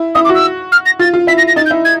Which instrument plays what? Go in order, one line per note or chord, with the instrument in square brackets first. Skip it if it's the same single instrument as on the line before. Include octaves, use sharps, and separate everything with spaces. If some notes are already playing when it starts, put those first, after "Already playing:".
Already playing: [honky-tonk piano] E4
[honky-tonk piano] E4 [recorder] D#6
[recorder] D6
[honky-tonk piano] F#4
[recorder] E6
F6
A#6
[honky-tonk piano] F4 [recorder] A6
[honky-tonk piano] F4
[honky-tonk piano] E4 [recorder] B6
[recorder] A#6
A#6
[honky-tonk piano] D#4 [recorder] A6
[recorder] G6
[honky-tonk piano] E4
[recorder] G#6